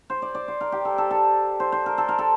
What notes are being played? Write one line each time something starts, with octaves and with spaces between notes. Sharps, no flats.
C5
D5
D5
C5
A#4
G4
A4
A4
A4
C5
C5
A#4
A4
A#4
A4